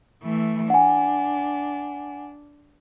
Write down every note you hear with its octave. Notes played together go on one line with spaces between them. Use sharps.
E3 A3
D4 F#5 G#5